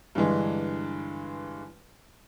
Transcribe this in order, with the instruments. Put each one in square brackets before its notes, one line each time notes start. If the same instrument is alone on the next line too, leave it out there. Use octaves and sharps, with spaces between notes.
[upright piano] G2 D3 E3 G#3